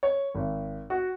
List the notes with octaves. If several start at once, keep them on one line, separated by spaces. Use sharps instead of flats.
C#5
G#1
F#4